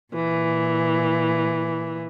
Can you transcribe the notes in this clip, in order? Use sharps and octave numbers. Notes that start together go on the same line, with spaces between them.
A#2 E3